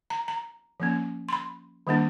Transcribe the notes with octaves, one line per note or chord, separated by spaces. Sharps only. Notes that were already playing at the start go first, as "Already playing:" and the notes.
A#5
A#5
F3 A#3 C#4
C6
B5
D#3 G3 A#3 D4